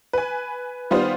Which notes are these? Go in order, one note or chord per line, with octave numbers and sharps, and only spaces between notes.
B4 G#5
D#3 G3 B3 F4 C5